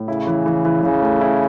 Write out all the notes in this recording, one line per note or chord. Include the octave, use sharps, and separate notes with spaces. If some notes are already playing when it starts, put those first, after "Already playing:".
Already playing: A2
C#3 E4
E3
E3
E3
C#3 E3
A3
E4